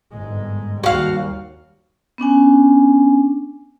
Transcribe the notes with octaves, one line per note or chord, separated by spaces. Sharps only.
G1 G#2 G#3
D#2 G3 F#4 F5
B3 C#4 D4 G#5